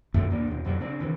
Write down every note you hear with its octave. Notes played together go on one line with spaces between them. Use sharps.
G1 F#2 B2 A3
D#2 A#2 A#3 D4
D#2 B2
F2 B2 F#3 G3
C#3 C4 D4
C3 D#3 E3